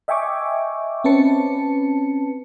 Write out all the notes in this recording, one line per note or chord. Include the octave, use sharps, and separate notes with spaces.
D#5 E5 G5 G#5 C#6 D6
C4 C#4 B4 A5 C#7